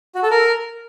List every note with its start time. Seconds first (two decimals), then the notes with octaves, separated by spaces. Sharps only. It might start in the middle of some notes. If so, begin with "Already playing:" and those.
0.15 F#4
0.23 A4
0.31 A#4